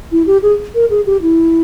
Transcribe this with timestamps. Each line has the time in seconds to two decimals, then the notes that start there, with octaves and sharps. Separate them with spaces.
0.12 E4
0.27 G4
0.42 G#4
0.75 A#4
0.90 G#4
1.06 G4
1.22 E4